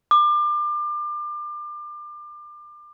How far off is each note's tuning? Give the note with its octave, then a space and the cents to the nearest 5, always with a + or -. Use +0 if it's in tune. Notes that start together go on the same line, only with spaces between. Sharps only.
D6 +30